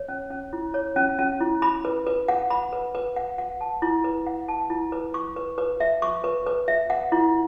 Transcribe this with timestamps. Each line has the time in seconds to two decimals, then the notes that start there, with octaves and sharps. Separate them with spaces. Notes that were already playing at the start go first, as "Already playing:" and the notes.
Already playing: C#5
0.08 C#4
0.30 C#4
0.53 E4
0.74 C#5
0.96 C#4
1.19 C#4
1.41 E4
1.62 B5
1.85 B4
2.07 B4
2.28 F#5
2.50 B5
2.73 B4
2.95 B4
3.16 F#5
3.38 F#5
3.61 A5
3.82 E4
4.04 B4
4.27 F#5
4.48 A5
4.70 E4
4.92 B4
5.14 C#6
5.36 B4
5.58 B4
5.80 E5
6.02 C#6
6.24 B4
6.46 B4
6.68 E5
6.90 F#5
7.12 E4